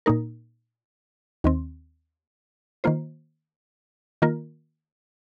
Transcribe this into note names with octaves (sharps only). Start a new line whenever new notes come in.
A#2 A#3 D#4 A#4
D#2 D#3 C4
D#3 A#3 F4 C5
D#3 A#3 F4 A#4